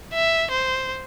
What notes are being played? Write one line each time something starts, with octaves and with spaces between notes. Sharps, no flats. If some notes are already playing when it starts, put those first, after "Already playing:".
E5
C5